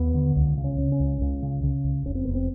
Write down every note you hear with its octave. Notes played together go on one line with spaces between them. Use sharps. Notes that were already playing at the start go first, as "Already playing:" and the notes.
Already playing: D#2 B3
D3
C#2
C#3
C#4
C#3
C#4
C#2
C#2
C#3
C#3
C#2
F1 C#4
C4
F1 B3
C4